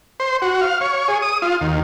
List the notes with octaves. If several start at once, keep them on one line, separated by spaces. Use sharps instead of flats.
C5
F#4
F5
C#5
G#4
D#6
F4
D#2